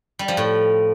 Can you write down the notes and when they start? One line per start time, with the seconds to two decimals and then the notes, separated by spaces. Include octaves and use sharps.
0.19 G3
0.28 F3
0.37 A2